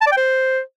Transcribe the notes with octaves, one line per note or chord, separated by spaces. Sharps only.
A5
D5
G5
C5